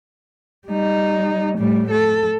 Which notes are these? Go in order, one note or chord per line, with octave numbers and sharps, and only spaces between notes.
G3 D#4
A2 G3
A4